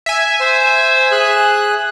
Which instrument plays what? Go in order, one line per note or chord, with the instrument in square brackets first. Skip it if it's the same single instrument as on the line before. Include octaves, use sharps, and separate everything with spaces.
[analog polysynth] E5 G#5
[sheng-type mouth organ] C5
G#4 F#6